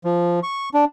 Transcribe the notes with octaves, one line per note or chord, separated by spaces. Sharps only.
F3
C#6
D4